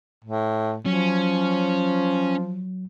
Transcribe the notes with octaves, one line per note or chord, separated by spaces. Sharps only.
A2
F3 F#3 C#4